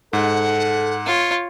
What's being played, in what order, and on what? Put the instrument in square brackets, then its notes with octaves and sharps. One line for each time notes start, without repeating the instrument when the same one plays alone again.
[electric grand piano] G#2 [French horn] A4 [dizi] F#5
[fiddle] F4 C#5